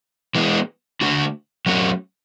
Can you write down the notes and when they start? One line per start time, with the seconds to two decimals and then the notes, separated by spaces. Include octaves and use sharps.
0.35 E3 G#3 B3
1.01 D3 A3 D4 F#4
1.66 F#3 A3 C#4 F#4